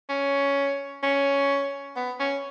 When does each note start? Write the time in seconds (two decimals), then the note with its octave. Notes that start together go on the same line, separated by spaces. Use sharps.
0.09 C#4
1.03 C#4
1.96 B3
2.20 C#4